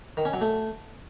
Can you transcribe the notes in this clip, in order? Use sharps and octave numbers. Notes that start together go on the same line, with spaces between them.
D#3
C#4
F#3
A3